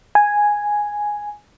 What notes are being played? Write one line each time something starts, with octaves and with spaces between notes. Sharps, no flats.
G#5